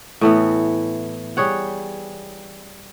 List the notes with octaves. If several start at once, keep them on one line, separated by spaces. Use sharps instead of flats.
A2 E3 B3
G3 G#4 C#5 F#5